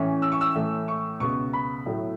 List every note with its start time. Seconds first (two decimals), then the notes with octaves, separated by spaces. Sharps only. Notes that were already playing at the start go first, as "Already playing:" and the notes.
Already playing: A2 E3 C#4
0.22 E6
0.32 C#6
0.41 E6
0.55 A2 E3 A3 E4
0.88 C#6
1.20 C#2 B2 B3 C#6
1.53 B5
1.86 A2 F#3 A3 E4